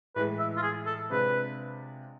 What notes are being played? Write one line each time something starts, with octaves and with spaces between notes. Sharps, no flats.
A2 E3 G#3 B4
E5
F4
G#4
A4
C3 G#3 D4 F4 B4